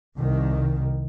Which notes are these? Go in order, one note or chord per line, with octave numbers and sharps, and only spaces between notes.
C2 D#3